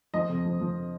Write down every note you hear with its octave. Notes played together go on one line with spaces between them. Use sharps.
F3 D#5
F2
F3
F3